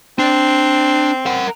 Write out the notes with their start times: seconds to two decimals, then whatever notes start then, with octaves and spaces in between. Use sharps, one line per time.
0.19 C4 D4
1.26 A#4 F#5